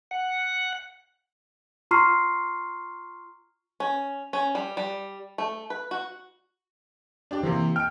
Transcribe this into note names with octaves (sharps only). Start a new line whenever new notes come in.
F#5
F4 A#5 C6 C#6 F6 C7
C#4
C#4
G3
G3
A3
B4
F#4
D4 G4 D5
C3 E3 A#3 C4
G5 F6 D7